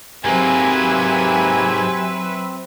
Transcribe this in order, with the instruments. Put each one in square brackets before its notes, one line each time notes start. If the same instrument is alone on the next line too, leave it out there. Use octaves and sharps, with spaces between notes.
[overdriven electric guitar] G#2 A#3 [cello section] F#3 B4 E5 [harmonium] C4 [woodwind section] G4 G#5